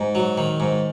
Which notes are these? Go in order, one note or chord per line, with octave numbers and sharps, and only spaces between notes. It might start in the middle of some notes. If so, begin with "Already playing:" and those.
Already playing: G#2
F#3
D#3
G#2